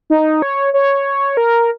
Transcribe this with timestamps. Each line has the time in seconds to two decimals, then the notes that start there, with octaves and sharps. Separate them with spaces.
0.10 D#4
0.42 C#5
0.74 C#5
1.37 A#4